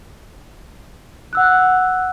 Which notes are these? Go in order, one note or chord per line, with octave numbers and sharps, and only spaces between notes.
F#5 E6 F#6